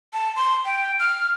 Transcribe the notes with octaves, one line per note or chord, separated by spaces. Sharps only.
A5
C6
G5
F6